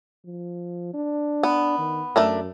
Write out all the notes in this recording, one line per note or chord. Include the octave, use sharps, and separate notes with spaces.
F3
D4
B3
D#3
F#2 A3 D4 A#4